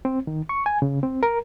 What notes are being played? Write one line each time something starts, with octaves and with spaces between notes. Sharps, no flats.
C4
D#3
C#6
G#5
C#3
C4
A#4